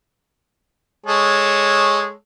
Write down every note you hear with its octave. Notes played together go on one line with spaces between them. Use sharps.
G#3 A4 C#5